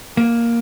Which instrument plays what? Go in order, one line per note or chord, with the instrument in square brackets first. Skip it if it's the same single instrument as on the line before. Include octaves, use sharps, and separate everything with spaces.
[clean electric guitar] A#3